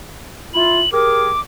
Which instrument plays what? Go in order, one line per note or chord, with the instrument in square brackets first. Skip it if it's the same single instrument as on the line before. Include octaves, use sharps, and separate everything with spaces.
[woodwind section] E4 F4 [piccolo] F#7
[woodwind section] G4 G#4 A#4 [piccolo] D6